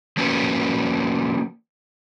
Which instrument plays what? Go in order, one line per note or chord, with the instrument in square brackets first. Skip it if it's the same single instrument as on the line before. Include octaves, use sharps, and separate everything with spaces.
[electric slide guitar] F3 A#3 C#4 F#4 A#4 B4